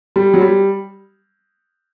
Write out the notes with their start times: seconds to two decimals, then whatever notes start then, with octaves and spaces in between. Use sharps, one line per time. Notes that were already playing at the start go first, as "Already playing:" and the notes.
0.16 G3
0.34 F#3
0.41 G3